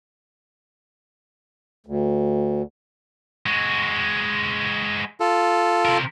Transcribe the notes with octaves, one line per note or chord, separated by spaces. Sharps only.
D2
G#3 F#4
F4 A4
C3 A#4